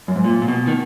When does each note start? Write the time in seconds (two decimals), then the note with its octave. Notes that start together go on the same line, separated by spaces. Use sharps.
0.08 F#2
0.16 G#2
0.24 A#2
0.42 A#2
0.48 B2
0.67 D#3